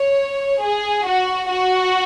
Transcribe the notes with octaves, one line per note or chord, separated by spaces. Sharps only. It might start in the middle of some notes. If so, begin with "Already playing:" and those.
Already playing: C#5
G#4
F#4
F#4